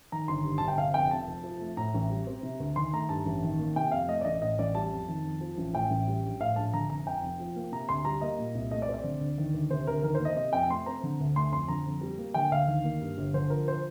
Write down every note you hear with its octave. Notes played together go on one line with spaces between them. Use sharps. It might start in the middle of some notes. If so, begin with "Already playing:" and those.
D#3 A#5
G1 C6
G2
G1 A5
G5
C3 F5
F1 G5
F2 A5
F1
F3
A3
A2 A#5
A1
G3
C4
C3
D2
D#3 C6
A3 A#5
G2 A5
A1
D#3
A#3
C3 G5
F2 F5
A3 D#5
D5
A1 D#5
A2 D#5
A1 D5
G3 A5
F2
D#3
F2
F3
A1
A2 G5
A1
G3
A#1
A2 F5
A#1 A5
D3 A#5
F1 A#5
F2 G5
F1
F3
A#3
C3 A#5
D2 C6
G3 A#5
A#3 D#5
A#2
C2
A3 D#5
D5
C4
D5
D3
D2
D#3
D2
C3 C5
D2 A#4
D#3 A#4
C5
A#3
D#5
C3 D#5
F2 G5
A3 C6
C4 A#5
D3
D2
A3 C6
F2 C6
D3 A#5
F2
G3
A#3
D3 G5
D2 F5
D#3
A#3
G2
G1
D3 C5
F3 A#4
C5